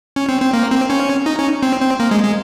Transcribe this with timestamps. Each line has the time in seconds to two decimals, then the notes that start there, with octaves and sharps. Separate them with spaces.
0.16 C#4
0.29 C4
0.41 C4
0.53 A#3
0.71 C4
0.90 C#4
1.26 D#4
1.39 C#4
1.63 C4
1.81 C4
2.00 A#3
2.11 G#3
2.23 G#3